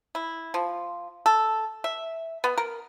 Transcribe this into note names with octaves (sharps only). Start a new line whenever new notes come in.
E4
F3
A4
E5
B3
A#4